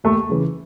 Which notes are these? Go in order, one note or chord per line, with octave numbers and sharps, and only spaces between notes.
D#2 A3
C#3 E3